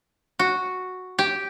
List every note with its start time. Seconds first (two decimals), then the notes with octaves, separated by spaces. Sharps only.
0.39 F#4
1.19 G4